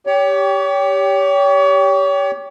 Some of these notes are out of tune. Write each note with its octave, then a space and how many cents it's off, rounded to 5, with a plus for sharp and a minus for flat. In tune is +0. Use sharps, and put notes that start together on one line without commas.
G4 +0 C#5 +35